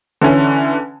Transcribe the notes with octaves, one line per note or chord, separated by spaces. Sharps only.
D3 E3 C#4